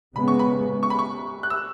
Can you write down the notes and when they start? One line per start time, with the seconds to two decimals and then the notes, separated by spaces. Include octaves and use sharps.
0.15 C#3 G#3 B3 B5
0.28 C#6
0.39 B5
0.83 C#6
0.90 B5
0.99 C#6
1.43 F#6
1.50 E6